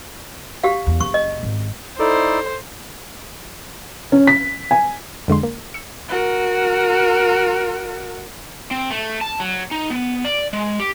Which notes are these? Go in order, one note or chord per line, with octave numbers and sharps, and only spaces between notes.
G4 F5
E2
F#1 C#6
D#5
G#1
D#4 E4 A4 C5 D5
C#4
B6
G#5
F2 D3 G#3 C6
A#3
E6 C#7
F#4 A#4
C4
A3
A5
F#3
D#4
B3
D5
G#3
G4